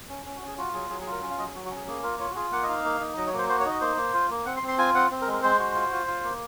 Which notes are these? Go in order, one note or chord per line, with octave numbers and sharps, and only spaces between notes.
C#4
C#4
F#4
C#4
G#4
F4 F#4
F#3 G#4
F#3 G#4
G#4
F4
A#4
C#4
F5
F#3 D#5
G#4
F#3 F#4
F#4
C#4
G#4
A#3 G#4
F4 A#4
F4 C#5
F#4
F4 G#4
A#3 F#5
D#5
D#4 F5
A#3
D#4
F#3 D#5
C#5
A#3
C5
F#4 C5
C#5
D#4
D#5
A#3 C5
A#3
F4
A#3
C4 F#5
C6
C4
C6
F4 G#5
C4 F#5
C4
A#4
G#3
A#4
G#3 C5
F#4
F4
F4
F4
A#3